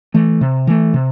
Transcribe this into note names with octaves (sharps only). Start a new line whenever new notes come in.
E3 A3
C3
E3 A3
C3